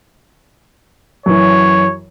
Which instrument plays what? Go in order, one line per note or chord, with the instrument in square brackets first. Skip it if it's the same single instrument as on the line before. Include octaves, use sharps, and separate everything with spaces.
[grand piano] F#2 E3 [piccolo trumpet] C#5